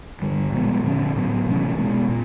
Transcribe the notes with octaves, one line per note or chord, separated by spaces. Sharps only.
G2 D3 G3
A#2 F3 G#3 B3
D3 F3 G#3 C#4
A2 F#3 B3
C3 E3 A3 C#4
B2 G#3 B3
A#2